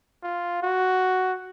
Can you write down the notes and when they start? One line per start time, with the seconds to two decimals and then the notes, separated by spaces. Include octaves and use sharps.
0.24 F4
0.63 F#4